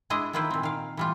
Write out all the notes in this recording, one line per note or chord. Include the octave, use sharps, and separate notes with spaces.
G#3 D4 E4 D#5
D#3 A#3 E4 F4 B4 C5
A#2 C4
D#3 F5
E3 G3 F4